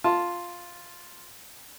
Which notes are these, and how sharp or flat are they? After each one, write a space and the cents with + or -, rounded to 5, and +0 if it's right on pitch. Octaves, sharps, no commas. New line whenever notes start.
F4 +0 A5 +0